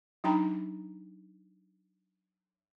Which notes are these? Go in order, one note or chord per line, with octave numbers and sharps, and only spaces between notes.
F#3 D4 D#4 G5 A#5 B5